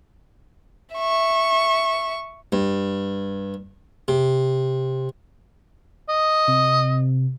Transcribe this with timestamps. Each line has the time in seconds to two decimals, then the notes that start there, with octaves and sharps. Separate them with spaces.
0.95 E5 C#6
2.52 G2
4.08 C3
6.09 D#5
6.48 C3